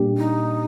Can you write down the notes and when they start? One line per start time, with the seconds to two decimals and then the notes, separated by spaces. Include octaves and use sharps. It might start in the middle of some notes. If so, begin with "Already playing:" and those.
Already playing: A#2 G3 A#3 D4 G4
0.17 D#4